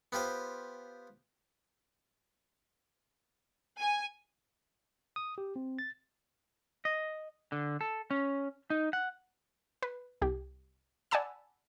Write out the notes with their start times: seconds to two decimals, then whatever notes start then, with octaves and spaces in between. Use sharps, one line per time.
0.12 B3 F4 G4 C5
3.79 G#5
5.16 D#6
5.38 G4
5.56 C4
5.79 A6
6.85 D#5
7.52 D3
7.81 A4
8.11 C#4
8.70 D#4
8.93 F#5
9.83 B4
10.21 C2 G4
11.11 D5 F#5 G#5 A5 B5 E6